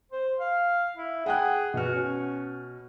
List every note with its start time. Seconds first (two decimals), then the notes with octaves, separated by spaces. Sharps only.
0.12 C5
0.39 F5
0.96 E4
1.26 G#4 F#5 G5 F#6
1.74 B2 F#4 F6
1.94 C#4